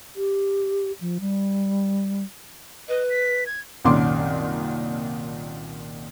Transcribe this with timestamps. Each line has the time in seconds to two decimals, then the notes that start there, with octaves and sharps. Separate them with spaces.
0.16 G4
1.01 F3
1.21 G3
2.88 B4 D#5
3.10 B6
3.46 G#6
3.85 C2 F#2 A#2 D#3 C6 D6